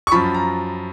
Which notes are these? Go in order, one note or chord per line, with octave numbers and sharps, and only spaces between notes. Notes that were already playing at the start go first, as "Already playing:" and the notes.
C#6
F#2 F3 B5
A#5